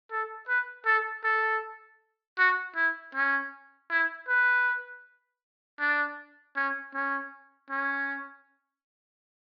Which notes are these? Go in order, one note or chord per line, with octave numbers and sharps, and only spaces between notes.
A4
B4
A4
A4
F#4
E4
C#4
E4
B4
D4
C#4
C#4
C#4